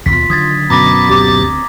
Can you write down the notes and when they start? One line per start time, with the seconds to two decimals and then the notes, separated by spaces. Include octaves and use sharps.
0.06 D#2 B2 F4 B6
0.30 D3 D#3 F#3 D#6 G#6 A6
0.70 F#2 B2 A#5 B5 D6 A6 A#6
1.09 D2 C4 G4